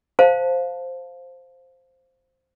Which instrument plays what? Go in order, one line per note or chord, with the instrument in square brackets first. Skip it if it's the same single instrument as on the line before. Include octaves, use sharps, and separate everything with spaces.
[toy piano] C5 F5 A5